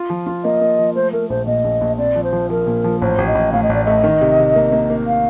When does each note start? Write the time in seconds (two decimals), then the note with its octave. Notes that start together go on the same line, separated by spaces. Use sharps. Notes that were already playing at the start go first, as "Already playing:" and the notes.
Already playing: F4
0.10 F3
0.27 F4
0.44 A#3 D#5
0.61 A#3
0.79 F3
0.95 A3 C5
1.13 A3 A#4
1.30 A#1 C5
1.47 A#2 D#5
1.64 A#1
1.81 A#1
1.98 C4 D5
2.16 F3
2.24 C5
2.33 F3
2.50 F3 A#4
2.67 A#2
2.84 F3
3.01 A1 C5
3.18 A1
3.27 D#5
3.35 A1
3.52 A2 F5
3.63 D#5
3.69 A1 D5
3.85 A3 D#5
4.04 D#3
4.21 C3
4.39 C3
4.56 A#3
4.72 A#3
4.90 A#3
5.07 F5